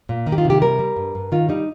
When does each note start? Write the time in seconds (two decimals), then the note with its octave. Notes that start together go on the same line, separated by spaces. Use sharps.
0.09 A#2
0.26 D#3 D#4
0.32 G4
0.38 F4
0.45 C3 G4
0.61 G3 A#4
0.79 G3
0.96 G2
1.15 G2
1.32 D#3 F4
1.49 G3 D#4